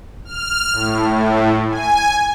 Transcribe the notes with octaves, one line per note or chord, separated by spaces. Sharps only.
F6
A2
A2
G#5